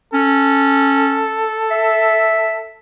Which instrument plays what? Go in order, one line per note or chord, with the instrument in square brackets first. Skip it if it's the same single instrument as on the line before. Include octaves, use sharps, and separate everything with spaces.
[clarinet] C#4 [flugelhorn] A4
[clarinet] E5